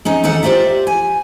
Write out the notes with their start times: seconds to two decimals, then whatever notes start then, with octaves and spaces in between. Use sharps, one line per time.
0.05 G#3 C#4 D#4
0.24 D#2 D#4 A4 F#5
0.43 F4 G4 C5 D5 E5
0.87 G#5